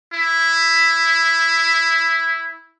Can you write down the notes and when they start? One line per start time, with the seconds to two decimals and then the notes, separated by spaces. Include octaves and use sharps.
0.13 E4